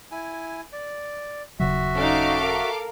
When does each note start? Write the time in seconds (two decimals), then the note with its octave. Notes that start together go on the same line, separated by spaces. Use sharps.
0.12 E4 G#5
0.73 D5
1.60 D#1 C#3 F#3 F#4 E5
1.95 C#4 D#4 A4 F5 D6
2.43 A#4